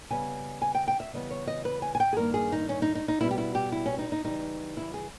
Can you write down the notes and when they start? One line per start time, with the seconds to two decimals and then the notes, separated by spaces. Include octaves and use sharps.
0.10 C#3 G3 B3 G#5
0.62 G#5
0.75 G5
0.88 G5
1.00 E5
1.13 C#3 E3 G3 B3 D#5
1.30 C#5
1.47 D#5
1.65 B4
1.82 G#5
1.95 G#5
2.00 G5
2.13 G#4
2.17 G2 D#3 A#3 A#4
2.34 G#4
2.52 D#4
2.69 C#4
2.82 D#4
2.95 D#4
3.08 D#4
3.21 B2 G3 B3 E4
3.31 G4
3.38 E4
3.55 G4
3.72 E4
3.86 C#4
3.99 D#4
4.12 D#4
4.24 C#3 E3 G3 D#4
4.77 E4
4.94 G#4